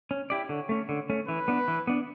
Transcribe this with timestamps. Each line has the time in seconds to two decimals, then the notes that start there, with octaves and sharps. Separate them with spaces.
0.11 C#4
0.30 E4 G4 D5
0.49 D3 C#5
0.69 A3 C#4
0.89 D3
1.10 A3 C#4
1.28 E3 B4
1.48 B3 D4
1.68 E3
1.87 B3 D4